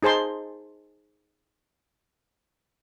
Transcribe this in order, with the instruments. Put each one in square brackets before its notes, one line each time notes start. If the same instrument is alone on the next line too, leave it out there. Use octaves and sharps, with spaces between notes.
[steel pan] D#4 G#4 C5 A5 C6